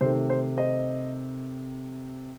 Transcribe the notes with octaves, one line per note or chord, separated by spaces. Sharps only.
C3 D#3 A3 C5
C5
C5 D#5